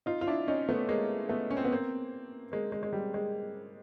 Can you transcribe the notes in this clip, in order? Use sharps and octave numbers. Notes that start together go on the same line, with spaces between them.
D#4 F4
F4
D4 E4
C#4 D#4
A3 B3
G#3 A#3
A3 B3
C#4
C4
B3
A#3 C4
G#3 A#3
G#3
G#3
G3
G#3